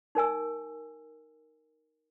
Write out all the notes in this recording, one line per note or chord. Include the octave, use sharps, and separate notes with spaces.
D#4 A#4 G#5 E6